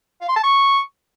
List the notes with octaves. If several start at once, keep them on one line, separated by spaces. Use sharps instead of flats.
F5
C6
A5
C#6